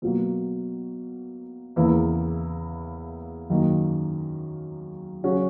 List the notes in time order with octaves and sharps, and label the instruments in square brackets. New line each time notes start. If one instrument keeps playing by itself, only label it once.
[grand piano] B2 F#3 A#3
E2 C#3 E3 A#3 E4
F#2 D#3 A#3 D#4
C#3 F#3 C#4 F#4